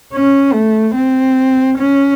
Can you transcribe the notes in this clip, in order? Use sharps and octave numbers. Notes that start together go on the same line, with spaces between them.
C#4
A3
C4
C#4